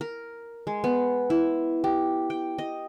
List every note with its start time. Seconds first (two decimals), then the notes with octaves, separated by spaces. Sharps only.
0.01 A#4
0.67 G#3
0.84 B3
1.30 E4
1.84 G4
2.30 G5
2.58 D#5